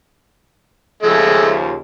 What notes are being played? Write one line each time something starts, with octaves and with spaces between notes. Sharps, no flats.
D#2 C#3 F3 G#3 A3